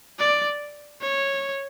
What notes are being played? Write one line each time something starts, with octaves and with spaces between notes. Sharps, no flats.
D5
C#5